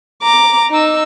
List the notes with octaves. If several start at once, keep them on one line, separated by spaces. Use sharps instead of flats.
A#5 D6
D#4 E6